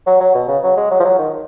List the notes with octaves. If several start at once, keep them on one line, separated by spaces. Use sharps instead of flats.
F#3
F#3
B2
C#3
F#3
G#3
F#3
F3
F#3
D#3